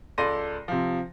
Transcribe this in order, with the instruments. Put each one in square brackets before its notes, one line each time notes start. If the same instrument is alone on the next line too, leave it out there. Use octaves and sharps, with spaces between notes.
[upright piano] C#2 A4 D5 C6 A#6 D#7
C3 F3